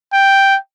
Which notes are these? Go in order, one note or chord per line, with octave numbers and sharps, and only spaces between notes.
G5